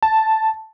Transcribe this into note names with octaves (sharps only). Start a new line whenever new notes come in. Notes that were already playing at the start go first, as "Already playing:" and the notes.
A5